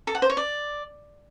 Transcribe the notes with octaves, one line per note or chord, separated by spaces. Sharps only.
A4
F#5
C5
C#5
D5